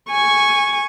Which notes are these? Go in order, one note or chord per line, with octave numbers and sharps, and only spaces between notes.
G#5 C#6